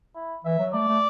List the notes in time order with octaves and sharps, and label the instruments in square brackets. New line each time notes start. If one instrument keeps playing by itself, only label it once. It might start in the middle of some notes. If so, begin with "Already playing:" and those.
[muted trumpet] E4
[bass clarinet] E3 [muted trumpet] E5
[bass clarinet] F#3
[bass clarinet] A3 [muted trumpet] D5
[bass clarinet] A3